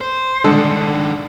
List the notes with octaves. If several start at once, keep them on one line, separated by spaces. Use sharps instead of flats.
C5
D3 D#3 G#3 D4 A4